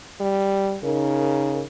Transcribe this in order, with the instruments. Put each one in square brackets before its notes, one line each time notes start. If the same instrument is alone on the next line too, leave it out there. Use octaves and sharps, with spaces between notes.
[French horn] G3
[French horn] C#3 [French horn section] D#4 A#4